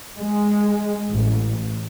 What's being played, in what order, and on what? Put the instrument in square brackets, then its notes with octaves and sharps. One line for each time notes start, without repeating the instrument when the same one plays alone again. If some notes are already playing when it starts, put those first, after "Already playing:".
[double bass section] G#3
A1